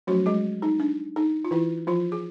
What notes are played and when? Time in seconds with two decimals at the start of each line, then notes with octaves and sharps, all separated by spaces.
0.07 F3 F#3 A3 C#4 F#4
0.26 G#3 G#4
0.62 D#4
0.80 D4
1.16 D#4
1.45 F4
1.51 E3 E4
1.87 F3 F4
2.12 G#4